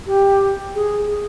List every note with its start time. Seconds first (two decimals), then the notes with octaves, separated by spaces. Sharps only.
0.07 G4
0.75 G#4